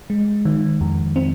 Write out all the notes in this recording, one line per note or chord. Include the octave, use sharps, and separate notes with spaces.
G#3
D#3
F2
C4